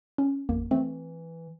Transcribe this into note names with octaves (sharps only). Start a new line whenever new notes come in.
C#4
A1 F2 A#3
E3 A3 C4